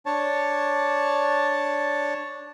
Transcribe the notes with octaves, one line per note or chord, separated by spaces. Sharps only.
D4 C#5 A5